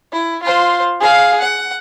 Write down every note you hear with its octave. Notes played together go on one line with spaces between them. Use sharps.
E4
F4 C5
G#4 F5
F#5